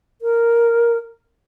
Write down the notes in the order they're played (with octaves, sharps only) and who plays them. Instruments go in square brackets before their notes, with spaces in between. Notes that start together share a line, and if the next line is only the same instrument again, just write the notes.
[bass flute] A#4